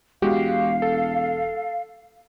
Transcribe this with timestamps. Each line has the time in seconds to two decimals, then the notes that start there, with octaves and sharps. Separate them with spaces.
0.22 E1 G#3 F#4 G4 F5
0.82 A4